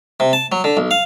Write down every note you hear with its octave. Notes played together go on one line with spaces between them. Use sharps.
C3
A5
F#3
D3
B1
F5